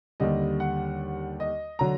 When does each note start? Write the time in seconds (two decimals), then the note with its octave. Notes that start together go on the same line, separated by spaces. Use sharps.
0.20 D#2 D3 G3 D#5
0.60 F#5
1.40 D#5
1.79 D3 F#3 A#5